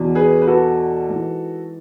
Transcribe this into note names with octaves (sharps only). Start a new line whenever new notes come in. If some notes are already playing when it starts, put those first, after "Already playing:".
Already playing: E2 B2
G#4 B4
B4
F#4 A4
G#2 E3